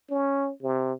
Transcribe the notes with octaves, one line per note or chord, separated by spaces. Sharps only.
C#4
C3